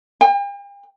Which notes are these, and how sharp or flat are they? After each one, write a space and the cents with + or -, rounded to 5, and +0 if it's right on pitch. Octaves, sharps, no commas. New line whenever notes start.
G5 +45